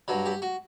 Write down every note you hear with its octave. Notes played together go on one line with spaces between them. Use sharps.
G2 F#3
G4
F#4